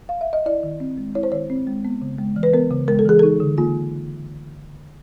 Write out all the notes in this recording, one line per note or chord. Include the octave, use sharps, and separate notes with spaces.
F5
E5
D#5
E4 D5
D#3
C4
G#3
E4 C#5
C5
D#3 C#5
C4
G#3
B3
C#3
G#3
E3
B4
B3 A#4
C#3
G#3 A#4
A4
E3 G#4
D#4 A4
D3
A#3 F4